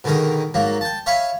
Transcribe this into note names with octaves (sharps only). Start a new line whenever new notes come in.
B2 D3 D#3 G#4 A#4
G#2 F#3 A#3
G5 A5
C#5 E5 F5 G#5 B5 C#6